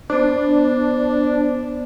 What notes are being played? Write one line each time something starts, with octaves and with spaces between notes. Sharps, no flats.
B3 D4 C5